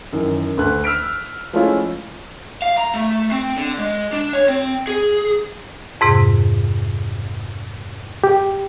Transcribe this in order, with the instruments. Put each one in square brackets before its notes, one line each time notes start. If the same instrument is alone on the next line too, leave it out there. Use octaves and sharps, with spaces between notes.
[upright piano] F#2 D#3 E3
D2 A4 B4 F#6
E6 F6 B6 D7
F3 G#3 A3 C#4 E4 F4
[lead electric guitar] F5
A#5
A3
C4
D3
G#3
D4
C#5
C4
G#4
[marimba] F2 G#2 C3
[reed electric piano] G4